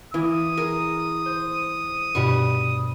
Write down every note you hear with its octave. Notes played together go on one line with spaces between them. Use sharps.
E3 A#3 D#6
G#4 A#4
C5
G2 B2 G3 B5 C#6